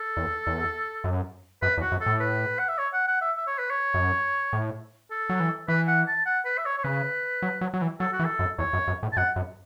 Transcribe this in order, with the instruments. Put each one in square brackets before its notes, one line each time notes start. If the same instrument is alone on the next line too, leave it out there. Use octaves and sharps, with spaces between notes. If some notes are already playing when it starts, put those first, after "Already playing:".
Already playing: [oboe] A4
[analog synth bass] E2
E2
F#2
[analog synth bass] F#2 [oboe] B4
[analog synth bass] E2
[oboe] F#4
[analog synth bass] F#2
[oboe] A4
[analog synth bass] A2
[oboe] B4
F#5
E5
C#5
F#5
F#5
E5
E5
C#5
B4
C#5
[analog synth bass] F#2
A2
[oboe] A4
[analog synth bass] F#3
E3
[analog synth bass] E3 [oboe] B4
[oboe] F#5
A5
F#5
B4
E5
C#5
C#5
[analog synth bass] C#3 [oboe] B4
[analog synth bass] F#3
F#3
F#3
E3
[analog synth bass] F#3 [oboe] A4
[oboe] F#4
[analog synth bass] E3
[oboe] A4
[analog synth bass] F#2
[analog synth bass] E2 [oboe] C#5
[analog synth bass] F#2
F#2
A2
[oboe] A5
[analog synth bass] F#2 [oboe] F#5
[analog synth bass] F#2